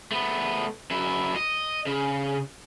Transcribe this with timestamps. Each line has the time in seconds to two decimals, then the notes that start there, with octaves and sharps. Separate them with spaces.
0.12 A3 B3
0.91 F#2 E4
1.36 D#5
1.87 C#3